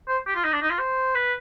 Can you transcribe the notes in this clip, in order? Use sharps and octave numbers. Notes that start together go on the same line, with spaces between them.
C5
G4
F4
D#4
D4
D#4
F4
C5
B4